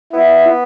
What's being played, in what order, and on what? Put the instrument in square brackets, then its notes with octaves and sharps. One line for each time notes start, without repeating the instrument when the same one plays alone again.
[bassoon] B3 [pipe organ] E4